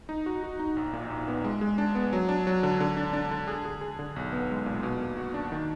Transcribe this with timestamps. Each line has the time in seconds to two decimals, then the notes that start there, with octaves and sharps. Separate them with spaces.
0.09 D#4
0.26 F#4
0.43 F#4
0.59 D#4
0.77 A#1
0.93 A#2
1.10 A#1
1.28 B3
1.44 G#3
1.61 G#3
1.78 D4
1.95 B3
2.13 F#3
2.29 D4
2.47 F#3
2.63 D3
2.80 D3
2.97 D4
3.13 D4
3.31 D3
3.48 G#4
3.65 G#4
3.81 G#4
3.99 D3
4.16 B1
4.33 B3
4.50 G#3
4.66 A#2
4.83 B2
5.01 A#3
5.17 F#4
5.34 D4
5.52 D#3